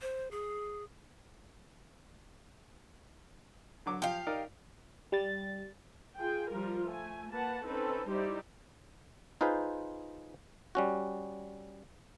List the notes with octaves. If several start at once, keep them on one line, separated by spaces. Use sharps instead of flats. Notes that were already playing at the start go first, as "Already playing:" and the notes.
C5
G#4
D3 F#3 D6
F3 G4 F5
D#4 A#4 D5
G3 A6
F4 G#4 G5
F3 G3 F4 A#4
A3 G#5
A#3 B4 F#5 A5
C4 C#4 D#4 A4 B4
G3 D#4 E4 G4 C5 D5
D#4 F4 G#4 B4 C5
G3 C#4 F#4